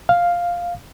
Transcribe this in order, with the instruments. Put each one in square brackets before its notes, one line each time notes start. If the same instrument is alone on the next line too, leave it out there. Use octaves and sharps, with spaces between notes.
[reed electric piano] F5